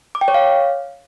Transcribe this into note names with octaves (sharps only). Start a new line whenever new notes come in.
D6
G5
C#5
F5